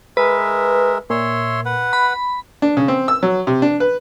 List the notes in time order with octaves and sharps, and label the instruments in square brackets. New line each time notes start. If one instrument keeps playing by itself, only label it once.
[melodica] G#3 A#4 E5 [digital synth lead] B4
[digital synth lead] A#2 [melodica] C#5 E5 C6
[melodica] B4 F#5
[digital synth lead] B5
[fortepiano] D4
C#3
C4
E6
F#3
C3
D4
B4